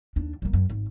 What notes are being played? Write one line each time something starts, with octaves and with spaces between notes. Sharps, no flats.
D#2 D4
G3 A#3
F#2
G#1